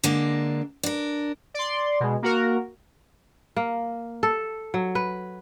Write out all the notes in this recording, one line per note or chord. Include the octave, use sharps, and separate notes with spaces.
D3 G#3 A#3 D4
D4 A#4
D5 C6
B2 G#3
A#3 F#4 A#4
A#3
A4
F#3
B4